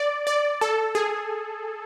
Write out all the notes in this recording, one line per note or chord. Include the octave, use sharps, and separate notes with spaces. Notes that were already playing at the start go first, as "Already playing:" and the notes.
Already playing: D5
D5
A4
G#4